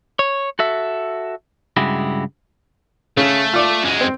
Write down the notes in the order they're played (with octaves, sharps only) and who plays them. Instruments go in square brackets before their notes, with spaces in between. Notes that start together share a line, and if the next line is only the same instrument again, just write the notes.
[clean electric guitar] C#5
F#4 A4 E5
G2 C#3 G#3 E4 F#4 G4
[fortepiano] C#3 [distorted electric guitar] A3
[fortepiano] F4 D5
[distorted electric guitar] F#2 G#3
[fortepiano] C4